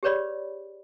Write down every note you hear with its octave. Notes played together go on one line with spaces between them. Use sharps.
G4 G#4 B4 C#5 D5 B5